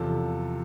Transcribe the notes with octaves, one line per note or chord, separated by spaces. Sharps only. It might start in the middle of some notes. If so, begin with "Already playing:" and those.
Already playing: E2 C3 F3 A4